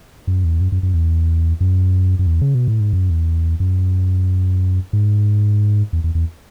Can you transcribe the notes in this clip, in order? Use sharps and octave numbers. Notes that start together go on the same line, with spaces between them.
F#2
E2
F#2
F#2
F#2
E2
F#2
F#2
E2
C#3
B2
A2
G#2
F#2
E2
F#2
G#2
E2
E2
E2